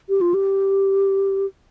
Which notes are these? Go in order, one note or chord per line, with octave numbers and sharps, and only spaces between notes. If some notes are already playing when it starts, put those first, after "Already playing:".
G4
F4
G4